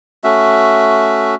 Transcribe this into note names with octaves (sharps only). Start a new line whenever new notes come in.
A3 C#4 F#4 E5